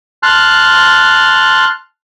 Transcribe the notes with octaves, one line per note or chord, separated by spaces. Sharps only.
A5 C6 F6 F#6